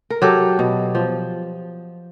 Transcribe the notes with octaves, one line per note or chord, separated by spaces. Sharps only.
A#4
F#3 G4 A4
B2
F3